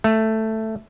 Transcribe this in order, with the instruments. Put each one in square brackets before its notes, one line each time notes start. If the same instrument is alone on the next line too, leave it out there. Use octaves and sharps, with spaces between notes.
[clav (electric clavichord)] A3